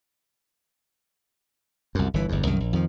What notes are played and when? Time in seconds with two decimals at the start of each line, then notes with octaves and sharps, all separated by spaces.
1.95 C2 F#2
2.14 G1 E3
2.29 G1 E2
2.47 C2 F#2 D#3
2.60 A#1
2.73 F2 D#3 F3